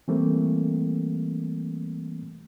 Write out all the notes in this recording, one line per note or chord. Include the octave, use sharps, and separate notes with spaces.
E3 G3 A3 A#3 C4